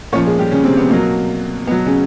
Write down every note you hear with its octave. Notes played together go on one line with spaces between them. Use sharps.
A#2 F3 C#4 C#5
G#3 G#4
G3 G4
C#3 C#4
C3 C4
B3
B2 F#3 A#3
B2 F#3 B3
C#3 C#4